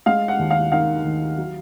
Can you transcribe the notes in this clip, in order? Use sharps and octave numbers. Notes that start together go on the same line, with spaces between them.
G#3 F5
F#5
D#2
F5
D#3 F5
D#2
F#3